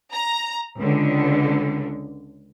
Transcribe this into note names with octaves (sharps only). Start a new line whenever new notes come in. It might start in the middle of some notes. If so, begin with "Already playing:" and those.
A#5
C#2 D3